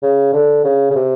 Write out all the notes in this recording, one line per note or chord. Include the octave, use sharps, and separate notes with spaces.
C#3
D3
C#3
C#3
C3